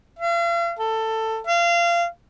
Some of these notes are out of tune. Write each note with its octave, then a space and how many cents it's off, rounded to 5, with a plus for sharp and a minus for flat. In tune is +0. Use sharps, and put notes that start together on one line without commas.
F5 -40
A4 +15
F5 -25